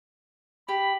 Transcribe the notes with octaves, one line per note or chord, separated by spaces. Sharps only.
G4 B5